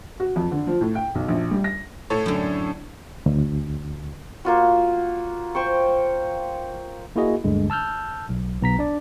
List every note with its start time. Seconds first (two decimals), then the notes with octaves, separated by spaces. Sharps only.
0.20 F#4
0.36 F2
0.52 D3
0.67 F3
0.81 A2
0.95 G5
1.15 B1
1.28 A#1
1.51 G3
1.64 A#6
2.10 A2 A4 C#5
2.26 F#2 D3
3.26 D2
4.45 A#3 F4 F#4
5.55 C5 G5 C#6
7.16 A#3 E4 F#4 G#4 D#5
7.44 D2 G2 D3 G#3
7.70 A5 E6 F6 G6
8.29 B1
8.61 B1 B3 A#5 B6
8.79 D4 D5